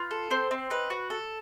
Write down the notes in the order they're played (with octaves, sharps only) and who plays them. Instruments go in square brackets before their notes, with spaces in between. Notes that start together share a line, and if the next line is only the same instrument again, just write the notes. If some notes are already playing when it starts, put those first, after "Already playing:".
Already playing: [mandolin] F4 B4
A4
C4 C5
C4
D#4 B4
F#4
A4